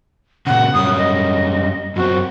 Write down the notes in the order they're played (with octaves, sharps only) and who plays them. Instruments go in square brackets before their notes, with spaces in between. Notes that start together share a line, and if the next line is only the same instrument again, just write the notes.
[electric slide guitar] A#2 C#3 [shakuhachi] F#5
[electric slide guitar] F#2 G3 C#4 [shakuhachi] D#6
[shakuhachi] D#5
[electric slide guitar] F#2 C4 [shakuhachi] F#4